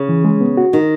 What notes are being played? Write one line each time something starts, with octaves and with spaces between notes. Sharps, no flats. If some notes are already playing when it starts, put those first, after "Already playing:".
Already playing: C#3
E3
G#3
B3
F#4
D#3 D#4